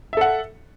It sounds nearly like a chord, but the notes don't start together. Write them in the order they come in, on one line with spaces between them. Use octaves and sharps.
E5 A4 F#5